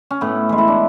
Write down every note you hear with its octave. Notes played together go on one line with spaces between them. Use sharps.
C#4
A2 B3
E3 G#3
E4
D4